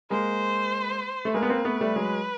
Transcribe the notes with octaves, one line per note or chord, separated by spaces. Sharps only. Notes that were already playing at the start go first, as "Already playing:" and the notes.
G#3 A#3 C5
A3
G#3 A#3 B4
B3
A#3 C4
A3 B3
G3 A3
F#3 G#3